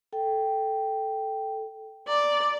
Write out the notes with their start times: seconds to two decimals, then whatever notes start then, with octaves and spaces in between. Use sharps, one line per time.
0.13 A4 G5
2.08 D5 A#5